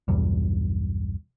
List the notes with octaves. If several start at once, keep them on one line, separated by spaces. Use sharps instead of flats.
B1 E2 G2